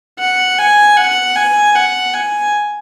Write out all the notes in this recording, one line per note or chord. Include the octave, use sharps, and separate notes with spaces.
F#5
G#5
F#5
G#5
F#5
G#5